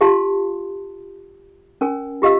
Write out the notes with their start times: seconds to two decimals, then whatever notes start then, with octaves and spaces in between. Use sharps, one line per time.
0.01 F4 G4 F5 A5 C6
1.81 C#4 A#4 G#5
2.22 F4 G4 D#5 F5 E6